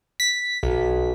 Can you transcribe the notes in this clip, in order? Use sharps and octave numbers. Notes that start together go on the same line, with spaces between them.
B6
B1